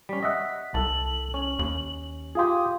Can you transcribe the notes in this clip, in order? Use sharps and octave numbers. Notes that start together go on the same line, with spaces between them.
G3 C#4 B6
D#5 E5 F#5
C2 A4 A5 F#7
C#4
D#2
F4 G4 G#4 F5 C6 D#6